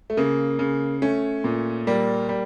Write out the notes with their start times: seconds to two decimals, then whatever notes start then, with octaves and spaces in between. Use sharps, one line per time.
0.10 A3
0.17 C#3 A#3
0.59 C#3
1.02 A3 C#4
1.44 A#2
1.87 G3 A#3
2.29 G3